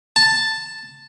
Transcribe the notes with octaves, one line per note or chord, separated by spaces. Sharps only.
A5